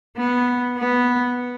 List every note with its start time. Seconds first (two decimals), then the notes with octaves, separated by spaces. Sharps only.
0.17 B3
0.78 B3